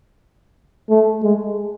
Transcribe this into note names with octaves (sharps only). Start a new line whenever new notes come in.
A3
G#3